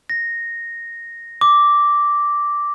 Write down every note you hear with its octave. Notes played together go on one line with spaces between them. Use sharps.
A#6
D6